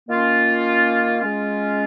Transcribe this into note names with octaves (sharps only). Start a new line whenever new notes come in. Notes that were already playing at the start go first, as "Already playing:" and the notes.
D#3 A#3 C#4 F4
G#3 C#4 F4